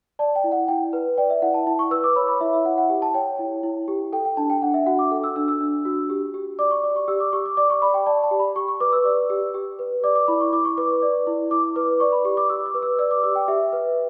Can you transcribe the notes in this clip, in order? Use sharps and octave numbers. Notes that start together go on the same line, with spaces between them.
D5 A5
G5
E4
F#5
E4 G5
B4
D5 G5
E5
E4 F#5
A5
E4 A5
C#6
B4 E6
D6
C#5 B5
B5
E4 E5
E5
E4 F#5
F#5
G4
A5
C#5 G5
E4
E4
G4
A4 G5
G5
D4 A5
G5
D4 F#5
E5
F#4 F#5
D6
A4
E6
D4 E6
E6
D4
F#4
G4
G4
D5 D6
C#6
D5
C#6
G4 E6
D6
G4 C#6
D6
D5 D6
C#6
D5 B5
G5
D5 A5
A5
G4
B5
G4 C#6
C#6
B4 D6
E6
D5
G4
G4
B4
D5 D6
D6
E4 B5
C#6
E4 D6
C#6
B4 D6
D5
E4
E4 D6
B4 D6
D5 C#6
B5
G4 C#6
D6
G4 E6
D6
B4
E6
D5 E6
D6
G4 D6
G5
G4 E5
B4